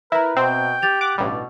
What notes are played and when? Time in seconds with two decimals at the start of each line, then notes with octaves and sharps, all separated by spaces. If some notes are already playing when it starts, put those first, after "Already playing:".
0.12 E4 A#4 B4 E5 A#5
0.36 B2 C4 G5
0.82 G4 G6 A6 F7
1.01 F#5 D6
1.18 A1 G2 B2 D5